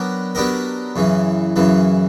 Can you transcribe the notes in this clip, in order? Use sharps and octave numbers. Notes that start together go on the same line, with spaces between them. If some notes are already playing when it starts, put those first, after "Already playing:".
Already playing: F#3 B3 D4 G4 A#4
F#3 B3 D4 G4 A#4
F#2 C#3 E3
F#2 C#3 E3